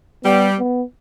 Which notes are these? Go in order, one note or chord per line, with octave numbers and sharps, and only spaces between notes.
G3 B3
B3